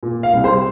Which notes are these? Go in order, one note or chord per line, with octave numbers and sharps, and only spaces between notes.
A#2
F5
C2
C5